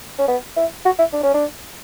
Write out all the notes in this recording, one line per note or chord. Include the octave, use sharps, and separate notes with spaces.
C#4
B3
E4
F#4
E4
D4
C#4
D4